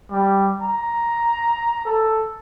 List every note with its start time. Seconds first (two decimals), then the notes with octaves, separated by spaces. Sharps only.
0.11 G3
0.62 A#5
1.85 A4